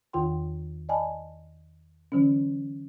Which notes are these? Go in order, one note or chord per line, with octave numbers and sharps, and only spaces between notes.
E2 D#3 F4 G5 C6
D5 D#5 G#5 A5 B5
D3 E3 F#3 C#4